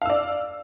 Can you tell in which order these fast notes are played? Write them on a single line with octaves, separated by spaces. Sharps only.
F5 E6 D5